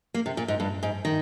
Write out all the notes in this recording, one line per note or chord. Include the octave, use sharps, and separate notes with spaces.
A#3
C3
A#2
G#2
G2
G#2
D#3